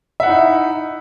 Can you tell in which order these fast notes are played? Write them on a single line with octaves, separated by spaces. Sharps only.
E5 F#5 E4 D#4